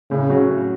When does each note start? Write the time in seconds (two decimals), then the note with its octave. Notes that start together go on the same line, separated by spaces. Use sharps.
0.10 A2 C#3
0.30 F#3 C#4 F#4
0.48 A2